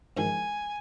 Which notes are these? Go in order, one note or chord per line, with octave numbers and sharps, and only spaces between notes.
G#2 D#3 F3 G#5